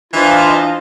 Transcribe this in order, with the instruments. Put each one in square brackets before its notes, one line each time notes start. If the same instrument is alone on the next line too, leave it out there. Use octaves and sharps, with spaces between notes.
[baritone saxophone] E3 [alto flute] D4 [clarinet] F4 [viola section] C5 D#5 F5